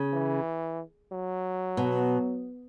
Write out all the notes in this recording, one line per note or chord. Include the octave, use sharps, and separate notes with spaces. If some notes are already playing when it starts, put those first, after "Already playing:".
Already playing: C#3
E3
F#3
B2